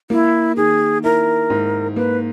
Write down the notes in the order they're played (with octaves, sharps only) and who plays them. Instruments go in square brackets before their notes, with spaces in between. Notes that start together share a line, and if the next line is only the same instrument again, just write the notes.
[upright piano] A#3 [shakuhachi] E4
[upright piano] D#3 [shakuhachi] G#4
[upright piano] E4 [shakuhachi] A#4
[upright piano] G#2
[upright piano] A#3 [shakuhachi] B4